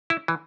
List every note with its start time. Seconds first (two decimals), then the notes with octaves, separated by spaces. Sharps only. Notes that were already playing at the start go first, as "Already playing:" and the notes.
0.10 E4
0.28 E3